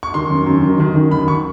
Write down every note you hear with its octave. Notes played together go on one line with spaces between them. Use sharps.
C#6
D#3 C6
F#2
F#2
D#3
D#3
D#3
F#2 B5
C#6